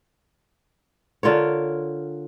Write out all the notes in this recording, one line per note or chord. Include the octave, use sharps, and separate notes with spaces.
D3 F4 A#4 C#5